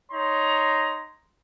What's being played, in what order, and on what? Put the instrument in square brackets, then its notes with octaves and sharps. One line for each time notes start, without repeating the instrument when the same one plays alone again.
[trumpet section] D#4 C#5 A#5 C6